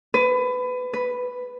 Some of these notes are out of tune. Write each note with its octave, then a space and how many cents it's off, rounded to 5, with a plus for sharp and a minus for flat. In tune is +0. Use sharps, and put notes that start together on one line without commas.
B4 +25
B4 +5